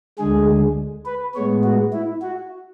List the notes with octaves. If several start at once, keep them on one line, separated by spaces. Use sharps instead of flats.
D2 D3 G#3 G#4
B4
A2 G#3 B3 C#5
F#4
E4
F#4